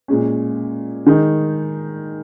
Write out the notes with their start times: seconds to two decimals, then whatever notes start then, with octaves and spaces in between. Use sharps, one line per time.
0.08 A#2 G#3 C#4
1.06 D#3 G#3 D#4